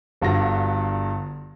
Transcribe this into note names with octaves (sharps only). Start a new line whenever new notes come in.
G1 G2 D3 F4 F#4 A#6